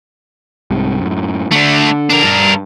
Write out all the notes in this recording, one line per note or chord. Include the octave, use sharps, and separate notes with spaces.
C2 G#2 C3
F#2 A2
D3 A3 D4
D4 A#4
G2